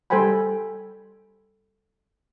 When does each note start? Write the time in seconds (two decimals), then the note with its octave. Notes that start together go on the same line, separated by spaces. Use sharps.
0.10 G3 A4 C5 G5 G#5 B5